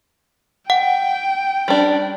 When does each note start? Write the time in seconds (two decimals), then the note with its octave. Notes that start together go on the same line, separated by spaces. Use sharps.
0.70 F#5 G5
1.68 G3 D4